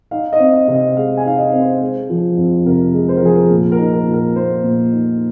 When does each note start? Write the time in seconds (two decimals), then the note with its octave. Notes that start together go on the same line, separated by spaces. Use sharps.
0.11 D#4 F5
0.33 D#5
0.40 C4
0.53 D#5
0.68 C3
0.75 D#5
0.97 G#3 F5
1.17 G#5
1.25 D#4 F5
1.38 D#5
1.53 C4
1.60 C5
1.81 G#3
2.10 F3
2.37 F2
2.65 C3 A#4
2.94 G#3
3.09 C5
3.17 A#4
3.22 F3 G#4
3.35 A#4
3.50 A#2
3.72 A#4
3.79 D#4
3.93 A#4
4.07 A#2
4.14 A#4
4.36 A#3 C5
4.64 A#2
4.92 D#4